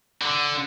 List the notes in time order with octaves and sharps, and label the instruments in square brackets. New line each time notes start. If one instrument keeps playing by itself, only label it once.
[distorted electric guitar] D3